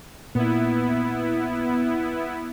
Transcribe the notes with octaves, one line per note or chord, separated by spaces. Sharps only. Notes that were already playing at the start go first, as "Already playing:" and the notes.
A#2 B3 E4